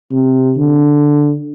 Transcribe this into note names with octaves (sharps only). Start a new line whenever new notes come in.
C3
D3